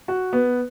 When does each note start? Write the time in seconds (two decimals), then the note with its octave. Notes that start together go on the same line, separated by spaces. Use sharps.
0.08 F#4
0.33 B3